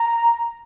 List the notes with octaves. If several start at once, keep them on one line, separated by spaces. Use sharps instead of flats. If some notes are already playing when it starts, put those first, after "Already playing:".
Already playing: A#5